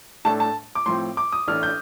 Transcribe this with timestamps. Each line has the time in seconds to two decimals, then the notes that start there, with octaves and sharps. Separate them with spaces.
0.25 A2 A3 D4 A5
0.40 A5
0.75 D6
0.86 A2 F3 C4 C6
1.17 D6
1.32 D#6
1.48 A1 A2 A3 D4 F6
1.63 G6